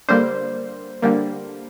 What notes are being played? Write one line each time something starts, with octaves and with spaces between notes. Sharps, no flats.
D3 G3 A#3 C5
D3 G3 A#3